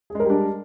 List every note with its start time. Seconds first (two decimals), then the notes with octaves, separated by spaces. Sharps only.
0.10 G#4
0.15 G#3
0.20 A#4
0.25 G3
0.30 D4